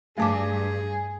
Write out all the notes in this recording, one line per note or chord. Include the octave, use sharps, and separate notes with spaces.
G2 A3 G#4 A5 D6